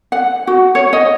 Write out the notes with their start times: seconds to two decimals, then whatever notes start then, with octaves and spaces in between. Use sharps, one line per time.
0.12 F#5
0.47 F#4
0.75 C#5
0.93 D#5